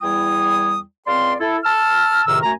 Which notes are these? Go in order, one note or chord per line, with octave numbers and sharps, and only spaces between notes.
E2 G3 E4 G5 D#6
C#2 C4 D5 F5 C6
E4 A4
A5 E6 F6
C#2 A2 C3 D#3 A#4 E6
F#2 A3 F#4 G#5 A#5